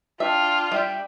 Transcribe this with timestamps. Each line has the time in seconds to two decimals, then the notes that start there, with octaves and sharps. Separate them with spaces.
0.20 D4 F4 E5 G5
0.72 G3 E5 G5